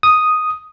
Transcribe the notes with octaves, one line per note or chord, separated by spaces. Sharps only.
D#6